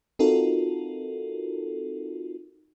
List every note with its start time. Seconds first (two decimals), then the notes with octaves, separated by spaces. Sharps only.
0.19 C4 D#4 F4 F#4 A4 A#4